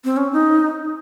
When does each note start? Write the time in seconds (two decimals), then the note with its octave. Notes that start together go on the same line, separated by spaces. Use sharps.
0.04 C4
0.17 C#4
0.33 D#4